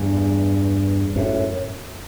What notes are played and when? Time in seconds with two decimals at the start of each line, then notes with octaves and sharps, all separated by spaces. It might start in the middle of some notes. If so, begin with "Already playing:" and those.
Already playing: E2 G2
1.16 F#2 A2